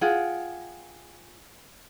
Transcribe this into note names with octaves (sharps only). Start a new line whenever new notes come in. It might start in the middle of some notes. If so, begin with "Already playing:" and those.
F4 G#4 F#5 G5